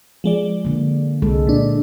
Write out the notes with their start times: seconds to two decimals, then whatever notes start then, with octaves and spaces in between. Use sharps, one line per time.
0.24 F3 G#3 D5
0.65 D3 A#3
1.22 C2 G#3 A4
1.47 A#2 D4